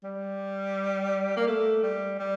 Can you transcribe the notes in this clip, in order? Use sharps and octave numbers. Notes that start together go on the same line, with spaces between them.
G3
A#3
A3
G3
G3